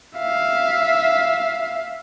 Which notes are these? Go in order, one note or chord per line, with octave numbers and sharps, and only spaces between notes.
E5 F5